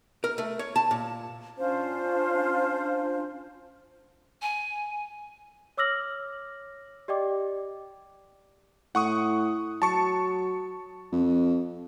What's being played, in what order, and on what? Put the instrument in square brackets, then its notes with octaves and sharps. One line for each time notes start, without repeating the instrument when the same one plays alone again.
[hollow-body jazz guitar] A#4
A3
C#5
A5
A#2
[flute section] C#4 D4 F4 C5
[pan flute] G#5
[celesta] C#5 D6 E6 F6 A#6 F#7
G4 D5 D#5 G5 D6
[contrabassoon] A2 [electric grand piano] F#5 C#6 D#6
[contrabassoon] F#3 [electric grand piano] A5 C#6 C#7
[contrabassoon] F2